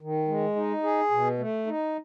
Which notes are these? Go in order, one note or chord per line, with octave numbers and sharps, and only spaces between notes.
D#3
G#3
D#4
G#4
B2
A3
D#4